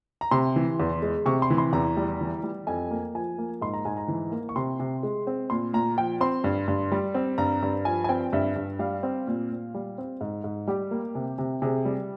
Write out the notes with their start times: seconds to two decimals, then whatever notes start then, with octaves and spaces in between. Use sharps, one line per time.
0.21 A#5
0.31 C3 C6
0.56 E3
0.80 E2
1.02 G#3
1.26 C3 C#6
1.42 C6
1.50 E3
1.58 C6
1.73 E2 A#5
1.97 G3
2.20 E3
2.43 G3
2.67 F2 G#5
2.91 A#3
3.15 F3 G#5
3.38 A#3
3.62 G#2 C6
3.74 A#5
3.85 G#2 G#5
3.97 A#5
4.08 E3
4.32 A#3
4.49 C#6
4.56 C3 C6
4.80 C3
5.03 G#3
5.27 C4
5.50 A#2 C6
5.73 A#2 A#5
5.97 F3 G5
6.21 C4 C6
6.44 G2
6.68 G2
6.92 G3
7.15 C4
7.38 G2 A#5
7.63 G2
7.85 F3 G#5
8.04 G#5
8.09 C4 G5
8.33 G2 E5
8.56 G2
8.79 G3 F5
9.03 C4
9.27 A#2
9.50 A#2
9.75 G3
9.98 C4
10.21 G#2
10.44 G#2
10.67 G3 G4
10.91 A#3
11.15 C3
11.38 C3
11.62 C3 G#4
11.85 G3